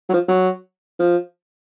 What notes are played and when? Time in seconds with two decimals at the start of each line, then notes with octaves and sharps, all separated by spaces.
0.09 F#3
0.14 F3
0.28 F#3
1.00 F3